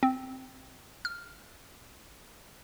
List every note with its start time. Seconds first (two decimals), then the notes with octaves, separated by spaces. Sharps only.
0.03 C4
1.05 F6